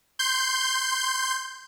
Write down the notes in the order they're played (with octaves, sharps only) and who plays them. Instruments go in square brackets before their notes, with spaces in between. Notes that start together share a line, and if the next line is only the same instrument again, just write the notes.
[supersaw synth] C6 G6